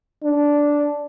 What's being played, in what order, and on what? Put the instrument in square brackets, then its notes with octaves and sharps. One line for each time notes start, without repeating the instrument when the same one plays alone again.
[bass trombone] D4